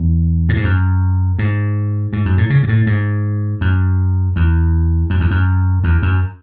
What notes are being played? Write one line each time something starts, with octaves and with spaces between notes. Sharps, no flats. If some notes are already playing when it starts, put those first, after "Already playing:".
Already playing: E2
A2
G#2
F#2
G#2
G#2
F#2
A2
C#3
G#2
A2
G#2
F#2
E2
F#2
E2
F#2
E2
F#2